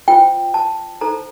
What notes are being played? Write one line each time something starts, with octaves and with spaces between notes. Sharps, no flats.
F4 C5 G5
A5
D#4 A4 C5 A#5